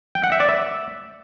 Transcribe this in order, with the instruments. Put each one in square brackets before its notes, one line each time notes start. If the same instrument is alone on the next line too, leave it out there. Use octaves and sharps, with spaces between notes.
[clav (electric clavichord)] G5
F#5
E5
D5
E5